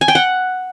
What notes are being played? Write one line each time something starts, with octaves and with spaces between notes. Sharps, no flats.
G#5
G5
F#5